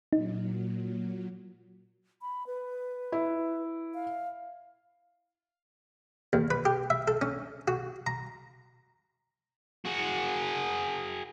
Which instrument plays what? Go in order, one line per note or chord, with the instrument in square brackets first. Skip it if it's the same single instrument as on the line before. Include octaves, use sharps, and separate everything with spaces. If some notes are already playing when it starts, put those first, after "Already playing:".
[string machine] A#2 F#3 [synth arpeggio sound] D#4
[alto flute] B5
B4
[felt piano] E4
[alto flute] F5
[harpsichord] D#2
B4
G4
E5
A4
C#4
F#4
A#5
[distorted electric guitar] F#4 G#4